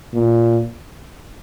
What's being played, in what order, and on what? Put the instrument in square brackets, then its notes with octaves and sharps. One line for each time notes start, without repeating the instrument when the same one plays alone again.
[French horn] A#2